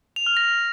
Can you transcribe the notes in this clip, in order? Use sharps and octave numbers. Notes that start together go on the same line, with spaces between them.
F7
F6
A#6